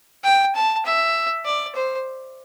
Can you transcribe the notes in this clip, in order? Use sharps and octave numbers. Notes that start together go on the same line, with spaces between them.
G5
A5
E5
D5
C5